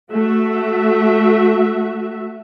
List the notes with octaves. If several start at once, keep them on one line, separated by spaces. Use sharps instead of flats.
A3 F#4 E5